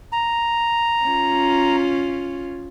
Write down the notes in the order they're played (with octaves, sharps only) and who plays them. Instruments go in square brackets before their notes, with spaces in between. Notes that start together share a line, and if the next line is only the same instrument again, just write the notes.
[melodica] A#5
[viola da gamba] C#4 F4